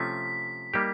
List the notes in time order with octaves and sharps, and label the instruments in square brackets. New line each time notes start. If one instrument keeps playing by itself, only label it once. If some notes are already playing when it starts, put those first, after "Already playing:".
Already playing: [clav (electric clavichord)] C3 F3 A3 C#4 F4 [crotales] B6
[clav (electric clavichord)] G3 A#3 D#4 G4